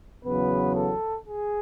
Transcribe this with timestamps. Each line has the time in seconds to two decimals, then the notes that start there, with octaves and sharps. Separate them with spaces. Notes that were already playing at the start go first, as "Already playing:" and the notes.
0.25 E2 C#3 F#3 B3 B4
0.73 A4
1.22 G#4